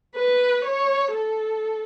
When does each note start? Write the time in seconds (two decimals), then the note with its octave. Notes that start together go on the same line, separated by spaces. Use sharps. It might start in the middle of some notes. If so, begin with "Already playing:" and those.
0.15 B4
0.65 C#5
1.15 A4